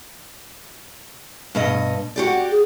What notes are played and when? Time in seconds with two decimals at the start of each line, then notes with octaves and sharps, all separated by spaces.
1.55 G2 B2 D#5
2.16 F#4 G4 D5
2.52 G#4